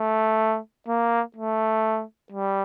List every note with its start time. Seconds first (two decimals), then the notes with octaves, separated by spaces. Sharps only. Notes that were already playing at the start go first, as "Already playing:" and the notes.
Already playing: A3
0.88 A#3
1.37 A3
2.32 G3